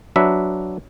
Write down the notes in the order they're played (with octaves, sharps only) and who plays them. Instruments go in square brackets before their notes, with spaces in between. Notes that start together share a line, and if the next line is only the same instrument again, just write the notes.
[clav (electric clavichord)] F#3 D4 B4 E5